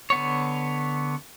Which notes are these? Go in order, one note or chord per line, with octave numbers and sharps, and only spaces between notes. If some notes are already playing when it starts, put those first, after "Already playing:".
D3 B3 C#5